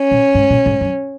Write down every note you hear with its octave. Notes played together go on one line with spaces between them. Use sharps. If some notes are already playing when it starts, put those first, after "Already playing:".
Already playing: C#4
A#2
G#2
A#2
G#2
F#2